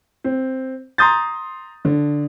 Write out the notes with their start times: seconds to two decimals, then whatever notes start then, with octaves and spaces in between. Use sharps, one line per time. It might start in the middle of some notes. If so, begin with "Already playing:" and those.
0.24 C4
0.98 A#5 C6 D#6 G6 A6
1.85 D3